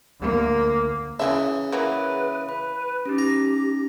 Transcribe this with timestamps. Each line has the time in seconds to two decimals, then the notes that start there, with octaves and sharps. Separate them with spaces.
0.20 D2 A#3
1.20 C#3 E3 C4 E5
1.72 E3 F#3 A#3 G#4 B4 E5 B5
2.49 B4 B5
3.06 C#4 D#4 G4
3.18 A#5